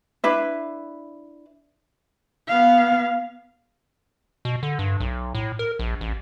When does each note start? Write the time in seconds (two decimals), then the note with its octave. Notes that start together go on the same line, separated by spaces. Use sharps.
0.24 D4 E4 B4 E5
2.48 B3 F5
4.45 B2
4.63 D3
4.79 G2
5.00 B1
5.35 A2
5.59 A#4
5.79 A#1
6.01 A1